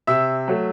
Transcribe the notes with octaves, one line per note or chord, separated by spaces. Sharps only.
C3 E5 E6
F#3 A3